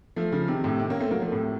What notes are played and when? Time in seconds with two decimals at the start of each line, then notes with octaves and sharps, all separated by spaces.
0.16 F3 A3
0.32 C#3 F3
0.48 C3 D#3
0.64 A2 C3
0.79 C3 D#3
0.90 A#3 C#4
1.00 A3 C4
1.11 F#3 A#3
1.21 F3 A3
1.32 A2 C3